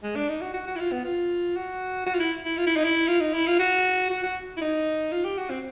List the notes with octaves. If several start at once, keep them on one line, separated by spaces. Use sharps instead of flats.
G#3
D4
D#4
F#4
F#4
F#4
E4
F4
B3
F4
F#4
F#4
F4
E4
E4
F4
E4
D#4
E4
F4
D#4
E4
F4
F#4
F#4
F#4
E4
D#4
F4
G4
F#4
C4